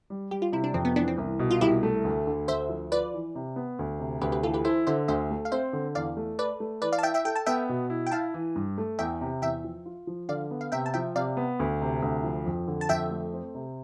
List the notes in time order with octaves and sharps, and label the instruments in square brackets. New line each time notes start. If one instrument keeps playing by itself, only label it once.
[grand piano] G3
[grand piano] G3 [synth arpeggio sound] G4
[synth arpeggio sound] F4
[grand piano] C3 [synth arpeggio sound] E4
[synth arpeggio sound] D4
[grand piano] F2 [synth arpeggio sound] C4
[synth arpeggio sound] B3
[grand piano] E3 [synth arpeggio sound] B3 D4
[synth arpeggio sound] C4
[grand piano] C2
B2
[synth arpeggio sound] F4
[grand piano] C2 [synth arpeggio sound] E4 G4
[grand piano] A3
D2
D3
[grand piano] D2 [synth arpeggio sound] C5 E5
[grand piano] F3
[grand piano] F4 [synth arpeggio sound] B4 D5
[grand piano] E3
C3
B3
D2
C3
[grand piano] D2 [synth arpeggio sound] G4 B4
[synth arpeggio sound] G4 B4
[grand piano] E3 [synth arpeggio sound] F4 A4
[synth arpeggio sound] G4 B4
[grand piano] E4 [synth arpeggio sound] A4 C5
[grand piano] D3 [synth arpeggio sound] C5 E5
[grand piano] D2 [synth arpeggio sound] C5 E5
[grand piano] A3
[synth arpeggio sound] F5
[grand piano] C4 [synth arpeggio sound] C5 E5
[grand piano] D3
[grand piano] E2 [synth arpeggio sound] D5 F5
[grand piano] A3
[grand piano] A4 [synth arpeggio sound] B4 D5
[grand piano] A3
[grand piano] E3 [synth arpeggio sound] B4 D5
[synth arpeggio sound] D5 F5
A5
[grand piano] E4 [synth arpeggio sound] E5 G5
[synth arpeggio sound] E5 G5
[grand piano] A4 [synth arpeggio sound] G5
[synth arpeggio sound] A5
[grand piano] B3 [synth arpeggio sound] E5 G5
[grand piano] B2
E4
[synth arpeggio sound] G5
[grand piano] E4 [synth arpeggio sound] F5 A5
[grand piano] E3
G2
A3
[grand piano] E2 [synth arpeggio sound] E5 G5
[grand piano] C3
[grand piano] E2 [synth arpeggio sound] E5 G5
[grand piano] F3
F4
F3
[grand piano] D3 [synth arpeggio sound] D5 F5
[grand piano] B3
[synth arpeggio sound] F5
[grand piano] C3 [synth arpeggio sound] E5 G5
[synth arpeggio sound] A5
[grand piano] F3 [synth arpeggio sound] E5 G5
[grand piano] C3 [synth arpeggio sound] D5 F5
[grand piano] B3
D2
C3
D2
F3
F2
D3
[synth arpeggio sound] A5
[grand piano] F2 [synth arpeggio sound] E5 G5
[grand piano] A3
C4
C3